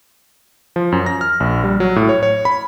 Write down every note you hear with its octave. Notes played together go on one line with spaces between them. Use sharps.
F3
F#2
A#6
F6
A#1
G3
F#3
A2
C#5
C#5
B5